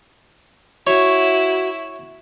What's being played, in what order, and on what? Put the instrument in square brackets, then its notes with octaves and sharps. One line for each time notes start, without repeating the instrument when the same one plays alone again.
[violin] E4 [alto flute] F#4 [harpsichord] C#5